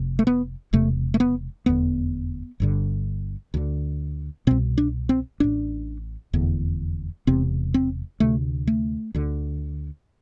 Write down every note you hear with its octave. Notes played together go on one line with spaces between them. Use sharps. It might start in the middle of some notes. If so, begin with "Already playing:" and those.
Already playing: F1 F2 C3
A3
B3
E1 E2 C3 A3
A3
B3
F1 E2 D3 B3
G1 G2 D3
D2 D3
C2 B2 C4
D4
C4
A1 A2 D4
F1 E2 D3
E1 E2 C3 C4
C4
D2 C3 A3
A3
D2 D3